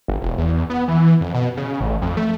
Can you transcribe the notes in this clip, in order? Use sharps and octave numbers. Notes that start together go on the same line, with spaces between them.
G1
E1
E2
B3
E3
F2
B2
C#3
A1
F2
A3